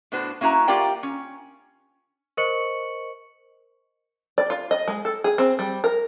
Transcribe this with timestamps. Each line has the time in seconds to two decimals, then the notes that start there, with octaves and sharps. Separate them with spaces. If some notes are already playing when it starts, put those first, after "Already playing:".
0.12 A2 B3 D4 F#4 C5
0.41 A#3 C#4 E4 F#4 A#5
0.68 A#3 F4 G4 A#4 D5 G5
1.03 C#4
2.37 A#4 C5 D#5 C#6 C#7 F#7
4.38 D5
4.50 F4
4.71 D#5
4.88 G#3
5.05 A4
5.24 G#4
5.38 C4
5.59 G3
5.84 A#4